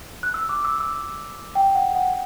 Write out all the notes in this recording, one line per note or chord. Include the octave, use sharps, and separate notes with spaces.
F#6
E6
D6
E6
E6
G5
F#5
F#5